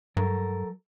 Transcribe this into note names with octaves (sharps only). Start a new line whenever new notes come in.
G2 F#3 A4 A#4